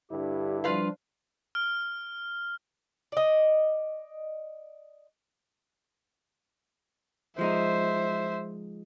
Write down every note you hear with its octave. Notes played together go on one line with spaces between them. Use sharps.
G2 D3 E4 G4
F3 G3 D4 F4 B4 F5
F6
D5 D#5
F3 G#3 D#4 C5 E5